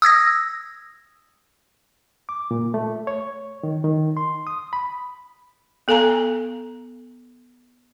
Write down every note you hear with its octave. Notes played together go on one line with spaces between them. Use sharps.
D#6 E6 G#6 A#6
D6
A#2
A3
C#5
D#3
D#3
C6
D#6
B5
B3 A4 F5 G#5 A#5